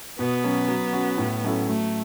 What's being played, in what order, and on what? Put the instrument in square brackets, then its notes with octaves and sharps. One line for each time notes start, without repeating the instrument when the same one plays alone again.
[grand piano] B2 [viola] B3
[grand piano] F#3 C#4
F#3
C#4 F#4
A2
F#3 C#4 E4 A4
[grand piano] F#3 [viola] A3